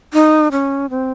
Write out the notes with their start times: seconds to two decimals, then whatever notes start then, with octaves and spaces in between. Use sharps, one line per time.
0.14 D#4
0.52 C#4
0.90 C4